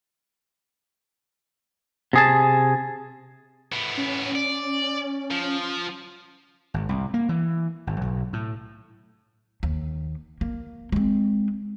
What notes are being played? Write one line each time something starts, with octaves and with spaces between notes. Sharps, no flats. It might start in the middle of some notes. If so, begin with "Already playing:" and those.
C3 G#4 A5
A2 B3
C#4
D5
F3
G#1
C2
A#3
E3
G#1
B1
A2
D#2
A#3
G#3 C4